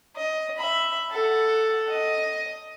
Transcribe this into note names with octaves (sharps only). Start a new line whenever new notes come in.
D#5
E5 B5
A4 F#5
D#5